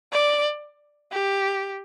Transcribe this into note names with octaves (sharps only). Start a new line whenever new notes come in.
D5
G4